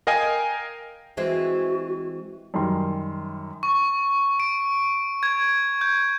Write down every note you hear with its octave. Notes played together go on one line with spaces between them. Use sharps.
A#4 D#5 F5 G5 G#5
E3 G#3 C4 F#4
F#2 D#3 G3 D#4 A#4 C6
C#6
D7
G#6
G6